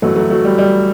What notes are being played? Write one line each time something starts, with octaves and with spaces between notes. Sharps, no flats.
G1 F#2 E3 F#3 A3
F#3 A3
F#3 A3
G3
G3